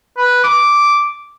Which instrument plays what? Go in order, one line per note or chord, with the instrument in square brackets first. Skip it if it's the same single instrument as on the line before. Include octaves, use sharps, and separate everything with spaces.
[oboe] B4
D6